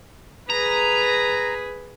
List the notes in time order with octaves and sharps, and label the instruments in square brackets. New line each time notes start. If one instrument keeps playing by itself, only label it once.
[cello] G#4 B4 [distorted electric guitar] A#5